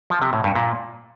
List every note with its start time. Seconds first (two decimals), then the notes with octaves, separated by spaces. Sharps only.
0.10 F3
0.22 C3
0.33 A2
0.44 G2
0.55 A#2